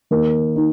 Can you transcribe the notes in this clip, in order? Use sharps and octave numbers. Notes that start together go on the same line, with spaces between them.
D#3 A#3 D#4
D#4